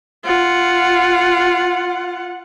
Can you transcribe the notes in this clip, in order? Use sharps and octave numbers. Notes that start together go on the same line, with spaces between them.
F4 F#5